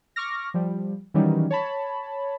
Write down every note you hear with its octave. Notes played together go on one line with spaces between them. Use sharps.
C#6 D6 F6 A#6
F3 G3
D#3 E3 F#3 G3 C#4 D#4
C#5 A5 B5